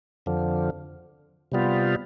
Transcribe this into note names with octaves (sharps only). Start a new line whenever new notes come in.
F2 D3 F3
C3 G3 B3 F4